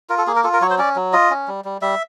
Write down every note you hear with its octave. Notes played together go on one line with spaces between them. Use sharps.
F4 A#4
A4
A#3 G#4
A#4
F4 A4
A#4
F#3 C#5
C5
C#4 D5
F#3
F4 D#5
C#4
G3
G3
G3 E5